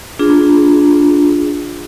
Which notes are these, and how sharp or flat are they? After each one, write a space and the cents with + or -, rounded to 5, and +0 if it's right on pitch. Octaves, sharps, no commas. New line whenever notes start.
D4 -10 F4 +0 G#4 +0